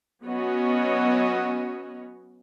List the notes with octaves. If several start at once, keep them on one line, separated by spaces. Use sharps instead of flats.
F#3 B3 C#4 F#4 C#5 D#5